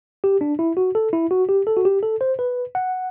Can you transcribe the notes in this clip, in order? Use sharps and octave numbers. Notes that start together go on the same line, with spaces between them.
G4
D4
E4
F#4
A4
E4
F#4
G4
A4
F#4
G4
A4
C5
B4
F#5